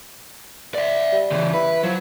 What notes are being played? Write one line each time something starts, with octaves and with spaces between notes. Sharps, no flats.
D5 E5
G3
C#3 E3
E4 B4
F3 F#3